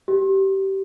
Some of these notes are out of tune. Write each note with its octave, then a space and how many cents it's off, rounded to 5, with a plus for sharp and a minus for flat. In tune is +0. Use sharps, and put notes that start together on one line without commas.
G4 -20